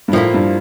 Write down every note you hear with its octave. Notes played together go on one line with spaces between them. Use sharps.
G2
A2 F3 A#3 E4
G2